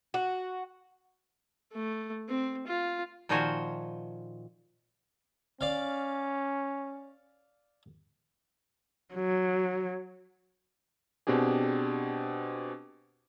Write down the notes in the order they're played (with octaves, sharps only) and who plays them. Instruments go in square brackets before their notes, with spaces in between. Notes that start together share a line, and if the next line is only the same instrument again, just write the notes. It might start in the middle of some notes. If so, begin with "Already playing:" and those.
[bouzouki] F#4
[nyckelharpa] A3
C4
F4
[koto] A#2 D#3 F3 F#4 C5 G#5
[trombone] C#4 [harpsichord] D5 F5
[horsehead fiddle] F#3
[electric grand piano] B2 C4 D4 G4 G#4